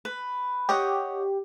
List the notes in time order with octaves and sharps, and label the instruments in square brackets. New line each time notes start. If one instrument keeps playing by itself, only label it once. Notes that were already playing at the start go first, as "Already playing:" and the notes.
[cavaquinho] B4
[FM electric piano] G4 [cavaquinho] C#5 D#5 F#5